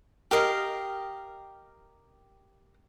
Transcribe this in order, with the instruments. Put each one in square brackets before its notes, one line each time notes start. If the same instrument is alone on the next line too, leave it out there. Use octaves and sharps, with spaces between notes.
[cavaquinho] G4 A#4 D#5 F5